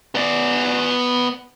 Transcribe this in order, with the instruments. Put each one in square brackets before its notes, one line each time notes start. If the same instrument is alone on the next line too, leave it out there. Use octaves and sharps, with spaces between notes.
[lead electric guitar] B3 D5